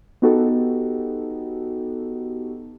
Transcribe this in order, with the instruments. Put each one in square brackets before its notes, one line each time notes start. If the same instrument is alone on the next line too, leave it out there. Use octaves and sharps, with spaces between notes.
[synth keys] B3 D#4 F#4 G4 A4